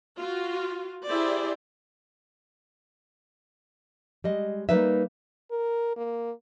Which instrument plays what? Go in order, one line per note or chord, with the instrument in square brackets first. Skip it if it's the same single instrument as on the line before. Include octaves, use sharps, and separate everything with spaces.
[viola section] F4 F#4
E4 G4 G#4 C5 D5
[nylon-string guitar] G3 G#3 D#5
G3 A#3 D#4 B4 D5 E5
[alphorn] A#4
A#3